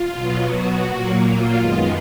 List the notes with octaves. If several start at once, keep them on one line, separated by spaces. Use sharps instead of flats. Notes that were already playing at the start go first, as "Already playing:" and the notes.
Already playing: F4
B2 F#3 B3
F#4
A#2 F#3 A#3
F4
F#2 D#3 G#3 B3